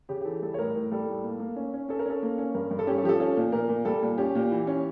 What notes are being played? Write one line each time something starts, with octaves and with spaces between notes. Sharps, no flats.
C#3 G4
G4
E3 A4
G3 A4
C#5
A2 A#4
A2
G3 A4
A2
A#3
A#3
C#4
C#4
C#4 A4
A#4
C#4 A4
A#3
C#4
G2 A#4
G2
A4
C#4 G4
A4
F3 G4
A4
C#4 A4
A#2
A#2 A#4
A#2
G3 A4
A#2
C#4 G4
A#2
E3
C#4